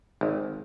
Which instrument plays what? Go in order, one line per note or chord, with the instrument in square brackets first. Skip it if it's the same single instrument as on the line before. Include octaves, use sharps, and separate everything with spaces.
[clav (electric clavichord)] G#1